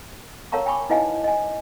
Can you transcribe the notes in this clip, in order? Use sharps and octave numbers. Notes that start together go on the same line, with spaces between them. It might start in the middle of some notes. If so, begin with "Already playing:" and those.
A#4 C#5 F5 A5 A#5 C#6
G5 G#5 B5 C#6 D6
D#4 E4 B4 D#5 F5 G#5
D#5 G#5